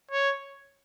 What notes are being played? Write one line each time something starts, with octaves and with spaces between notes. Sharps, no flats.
C#5